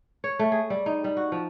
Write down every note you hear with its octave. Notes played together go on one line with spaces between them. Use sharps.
C#5
A3
G#4
G3
D#4
G3
F#4
F3